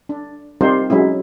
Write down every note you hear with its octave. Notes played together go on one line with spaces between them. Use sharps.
D4
G3 C4 D#4 F4 A#4 C5
F#3 G#3 C#4 E4